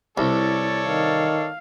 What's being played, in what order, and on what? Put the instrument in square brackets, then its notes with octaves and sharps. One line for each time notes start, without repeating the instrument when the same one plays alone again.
[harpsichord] C2 [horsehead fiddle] E4 [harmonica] A4 C#5 D5
[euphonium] D#3 [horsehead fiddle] F5